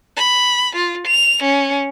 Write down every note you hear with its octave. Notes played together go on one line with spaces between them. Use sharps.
B5
F4
F7
C#4